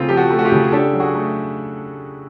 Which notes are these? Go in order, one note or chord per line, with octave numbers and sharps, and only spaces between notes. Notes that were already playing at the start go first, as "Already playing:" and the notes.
Already playing: C#3 A3 C4 F4
F3 G4
F#4
A3
F#4
F4 G4
C#3
G#4
D4 G4 A4
F#3
F#4 G#4
A3